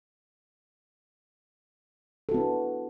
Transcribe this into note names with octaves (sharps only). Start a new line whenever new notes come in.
B3 D4 E4 F#4 A4